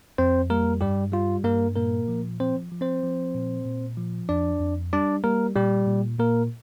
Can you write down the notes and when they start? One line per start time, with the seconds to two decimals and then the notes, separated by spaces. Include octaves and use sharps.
0.18 F2 C4 C5
0.50 G3 A#3 A#4
0.81 G2 G3 G4
1.12 G3 F4
1.44 G2 A#3 A#4
1.76 A#2 A#3 A#4
2.08 F3
2.40 F3 C4 C5
2.72 F3
2.81 C4 C5
3.03 F3
3.35 A#2
3.66 A#2
3.97 F3
4.29 F2 D4 D5
4.60 F2
4.93 G3 D4 D5
5.24 G3 A#3 A#4
5.56 A#2 G3 G4
5.87 A#2
6.19 A#2 A#3 A#4